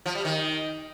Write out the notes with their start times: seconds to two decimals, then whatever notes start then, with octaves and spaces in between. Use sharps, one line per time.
0.06 F3
0.15 G3
0.25 D#3